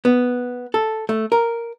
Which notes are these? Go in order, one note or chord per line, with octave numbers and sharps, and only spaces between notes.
B3
A4
A3
A#4